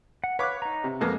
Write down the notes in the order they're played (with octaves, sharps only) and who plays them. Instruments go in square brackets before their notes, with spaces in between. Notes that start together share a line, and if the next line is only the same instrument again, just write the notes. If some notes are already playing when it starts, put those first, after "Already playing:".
[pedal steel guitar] F#5
[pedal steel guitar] B4 F#6 [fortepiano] C#5 F5 D6
[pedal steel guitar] D#4 A#5
[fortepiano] C3
[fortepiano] F2 A#3 B3 [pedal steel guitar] G#3 A4